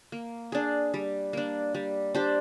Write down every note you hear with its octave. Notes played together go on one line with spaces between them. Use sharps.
A#3
D4 G#4
G3
A#3 D4
G3
D4 G4 C5